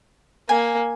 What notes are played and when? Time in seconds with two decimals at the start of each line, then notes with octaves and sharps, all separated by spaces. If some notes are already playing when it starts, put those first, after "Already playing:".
0.49 A#3 G#5